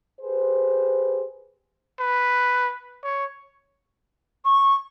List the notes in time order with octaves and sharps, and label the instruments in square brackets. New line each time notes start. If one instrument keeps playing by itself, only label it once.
[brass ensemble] G4 G#4 B4 C5
[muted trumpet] B4
C#5
[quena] C#6